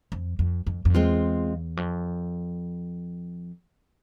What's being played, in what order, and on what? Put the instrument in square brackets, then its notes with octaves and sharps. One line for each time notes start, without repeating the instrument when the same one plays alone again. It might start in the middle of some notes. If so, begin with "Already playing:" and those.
[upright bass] F2
F2
F2
F2
[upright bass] E2 [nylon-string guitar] G#3 C4 F4
[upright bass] F2